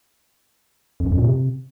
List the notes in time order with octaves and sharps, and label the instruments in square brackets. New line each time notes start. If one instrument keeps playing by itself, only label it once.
[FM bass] F2
F#2
F2
A#2
C3